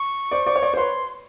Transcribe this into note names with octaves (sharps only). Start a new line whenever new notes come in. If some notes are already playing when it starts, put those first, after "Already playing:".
Already playing: C#6
C5 D5
C5 D5
C#5
C5 D5
C5
B4 C#5 C6